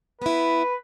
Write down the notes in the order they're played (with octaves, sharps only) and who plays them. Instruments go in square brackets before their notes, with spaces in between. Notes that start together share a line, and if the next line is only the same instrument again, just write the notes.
[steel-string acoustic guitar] B3 E4 [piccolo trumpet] B4